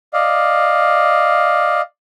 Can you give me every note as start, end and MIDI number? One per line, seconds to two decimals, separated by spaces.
0.13 1.81 74
0.13 1.81 75
0.13 1.81 77